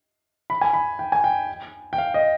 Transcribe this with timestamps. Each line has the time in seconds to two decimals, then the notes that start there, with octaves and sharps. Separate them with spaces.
0.50 B5
0.61 G#5
0.73 B5
0.99 G5
1.12 G#5
1.24 G5
1.93 G5
1.98 F5
2.14 D#5